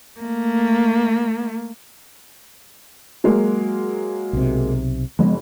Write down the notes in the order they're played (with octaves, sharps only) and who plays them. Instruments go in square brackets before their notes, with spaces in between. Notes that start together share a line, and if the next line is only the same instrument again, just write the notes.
[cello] A3 A#3
[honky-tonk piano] F#3 G#3 A#3
[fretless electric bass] B1 C3
[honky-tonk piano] F#1 [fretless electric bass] F3 G#3 B3